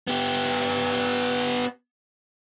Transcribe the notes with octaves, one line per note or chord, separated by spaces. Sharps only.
B3 G4